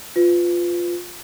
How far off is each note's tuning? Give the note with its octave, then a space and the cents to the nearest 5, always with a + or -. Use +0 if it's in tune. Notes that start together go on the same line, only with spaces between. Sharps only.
F4 +0 B4 +25